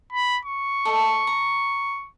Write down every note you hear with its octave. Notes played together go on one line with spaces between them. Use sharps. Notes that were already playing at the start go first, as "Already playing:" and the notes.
B5
C#6
A4 D#5
A#5